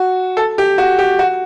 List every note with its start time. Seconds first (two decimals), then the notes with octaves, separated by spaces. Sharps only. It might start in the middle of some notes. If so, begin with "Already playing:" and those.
Already playing: F#4
0.37 A4
0.58 G4
0.78 F#4
0.98 G4
1.19 F#4